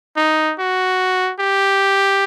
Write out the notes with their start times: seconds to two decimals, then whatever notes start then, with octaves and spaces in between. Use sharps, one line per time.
0.17 D#4
0.59 F#4
1.40 G4